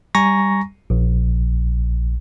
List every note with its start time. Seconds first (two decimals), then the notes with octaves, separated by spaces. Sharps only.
0.15 G3 G#5 A#5 C#6 A#6
0.90 A#1